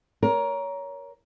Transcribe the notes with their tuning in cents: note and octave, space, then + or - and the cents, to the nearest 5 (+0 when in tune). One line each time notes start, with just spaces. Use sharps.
A#4 +15 C#5 +25